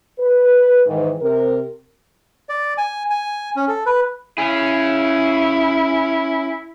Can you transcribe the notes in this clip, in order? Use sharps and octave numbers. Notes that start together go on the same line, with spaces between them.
B4
G#2 D#3 E3
C3 A#4
D5
G#5
G#5
C#4
A4
B4
C#4 E4 G#4